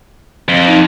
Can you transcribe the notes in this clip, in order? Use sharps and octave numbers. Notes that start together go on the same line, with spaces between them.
F2 D7 F#7 G7
D#4 F7